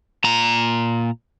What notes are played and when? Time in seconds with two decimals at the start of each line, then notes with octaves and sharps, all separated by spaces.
0.24 A#2 A#5